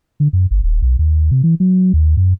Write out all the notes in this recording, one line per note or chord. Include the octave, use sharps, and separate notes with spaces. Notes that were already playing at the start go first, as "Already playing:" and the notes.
D3
F#2
G1
D#1
B1
D#2
C3
E3
F#3
D#2
F#2